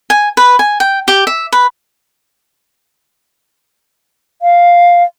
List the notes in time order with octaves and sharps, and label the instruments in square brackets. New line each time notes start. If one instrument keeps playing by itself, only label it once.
[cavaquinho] G#5
B4
G#5
G5
G4
E5
B4
[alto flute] F5